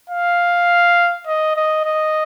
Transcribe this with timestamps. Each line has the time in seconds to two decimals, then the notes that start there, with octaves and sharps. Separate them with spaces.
0.10 F5
1.27 D#5
1.56 D#5
1.85 D#5